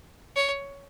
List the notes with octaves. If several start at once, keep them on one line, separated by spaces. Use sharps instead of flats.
C#5